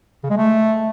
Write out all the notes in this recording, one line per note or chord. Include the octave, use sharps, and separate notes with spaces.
C#3
G#3
A3